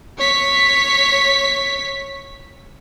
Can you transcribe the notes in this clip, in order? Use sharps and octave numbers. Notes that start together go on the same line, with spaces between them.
C#5 B6